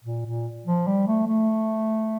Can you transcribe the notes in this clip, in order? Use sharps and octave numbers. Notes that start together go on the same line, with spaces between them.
A#2
A#2
F3
G3
A3
A3